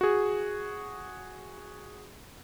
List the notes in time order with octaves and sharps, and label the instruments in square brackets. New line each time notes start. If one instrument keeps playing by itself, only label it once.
[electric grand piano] F#4 G#4